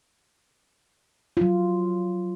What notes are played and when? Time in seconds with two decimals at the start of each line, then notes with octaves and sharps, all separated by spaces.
1.37 F#3 F4